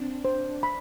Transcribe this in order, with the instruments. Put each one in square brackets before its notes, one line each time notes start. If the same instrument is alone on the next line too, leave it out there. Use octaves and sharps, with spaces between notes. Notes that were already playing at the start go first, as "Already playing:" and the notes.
Already playing: [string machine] C4 D4
[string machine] D4 [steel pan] C5
[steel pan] B5